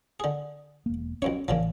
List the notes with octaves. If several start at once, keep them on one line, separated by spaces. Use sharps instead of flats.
D3 G#4
E1 A#3
B1 F2 C#4 C#5
A1 A#2 C#3 E3 F3